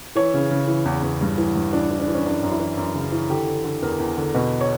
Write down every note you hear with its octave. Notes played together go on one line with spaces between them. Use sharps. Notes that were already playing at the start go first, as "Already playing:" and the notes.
E3 C#5
C#3
C#3
E3
E2
E2
G2
E3
G2
E3 D4
E3
D4
E3
C#4
F#2 D4
F#2
E4
E3
F#2
C#3
E3
D3 G4
D3
D3
E2 A#4
E2
D3
B2 B4
C#5